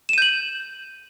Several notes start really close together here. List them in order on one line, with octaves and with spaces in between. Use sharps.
E7 D#7 G6 F#7